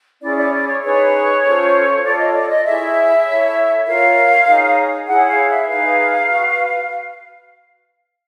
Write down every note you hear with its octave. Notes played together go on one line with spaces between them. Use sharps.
C#4 E4 G#4 D5
D5
D5
C#5
D#4 G#4 B4 C#5
C#4 F4 A4 C5
F4 A4 C#5 D5
D#5
D5
D#5
E4 G#4 C#5 E5
E4 A4 C#5
F4 A#4 C#5 F5
D#4 G#4 C#5
E4 G#4 C#5 F#5
F5
E5
D#4 G#4 B4 F5
F#4 B4